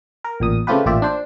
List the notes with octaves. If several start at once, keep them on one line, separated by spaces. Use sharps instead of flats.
A#4
A1 A#2 D#6
C#3 A3 C4 F4 G4 B4
A1 A#2 F4 G4 D5 E5
D4 C5